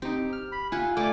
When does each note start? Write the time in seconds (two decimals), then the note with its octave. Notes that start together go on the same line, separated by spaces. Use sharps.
0.02 C4 D#4 G4
0.33 F6
0.52 B5
0.72 E4 F4 F#5 G#5
0.97 A3 F4 A4 D5 G#5 D6